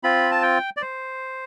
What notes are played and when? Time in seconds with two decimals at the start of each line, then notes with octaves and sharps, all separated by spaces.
0.03 C4 F4 B5
0.31 A5
0.43 G5
0.77 D5
0.82 C5